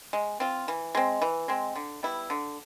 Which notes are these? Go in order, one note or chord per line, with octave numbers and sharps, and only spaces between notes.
G#3
C4 F4
E3
G#3 C4
E3
G#3 C4
D3
G3 B3 E4
D3